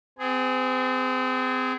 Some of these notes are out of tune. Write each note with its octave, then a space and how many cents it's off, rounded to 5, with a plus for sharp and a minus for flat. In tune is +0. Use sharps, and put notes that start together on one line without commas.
C4 -35 G#4 -5